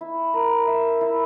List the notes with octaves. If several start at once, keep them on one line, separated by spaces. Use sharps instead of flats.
E4
A#4
E5
E4